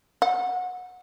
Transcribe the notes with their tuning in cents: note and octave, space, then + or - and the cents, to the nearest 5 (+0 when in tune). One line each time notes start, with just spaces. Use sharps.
F#5 -25